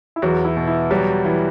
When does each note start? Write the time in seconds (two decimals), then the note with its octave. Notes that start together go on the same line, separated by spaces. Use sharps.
0.16 E4
0.22 E2 F#3 F#4
0.45 E4
0.57 B2
0.67 E4
0.91 F#3 G3 F#4
1.24 E3